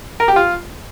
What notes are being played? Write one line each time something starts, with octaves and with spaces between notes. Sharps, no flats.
A#4
G4
F4